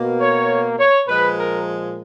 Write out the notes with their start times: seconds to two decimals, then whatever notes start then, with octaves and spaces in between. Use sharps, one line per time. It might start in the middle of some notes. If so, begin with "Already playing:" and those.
Already playing: B2 A#3
0.19 C#5
0.79 C#5
1.07 A#2 F3 G#3 B4
1.37 A#4